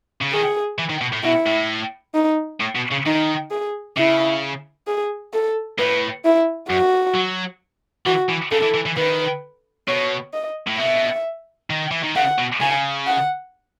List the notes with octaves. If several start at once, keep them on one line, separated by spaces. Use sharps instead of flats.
C#3
D#3 G#4
E3
D#3
B2
A2
B2 E4
A2
D#4
A2
B2
C#3
D#3 D#4
G#4
C#3 E4
G#4
A4
A2 B4
E4
F#2 F#4
F#3
E3 F#4
E3
C#3 A4
E3
E3
E3
D#3 B4
B2 C#5
D#5
A2
B2 E5
D#3
E3
D#3
C#3 F#5
B2
C#3 G#5
F#5